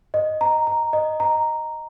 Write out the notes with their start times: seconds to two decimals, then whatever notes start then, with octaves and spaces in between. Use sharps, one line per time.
0.14 D#5
0.41 A#5
0.67 A#5
0.93 D#5
1.20 A#5